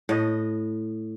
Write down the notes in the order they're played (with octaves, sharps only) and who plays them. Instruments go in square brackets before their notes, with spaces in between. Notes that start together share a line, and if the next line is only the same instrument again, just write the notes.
[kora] A2 D#5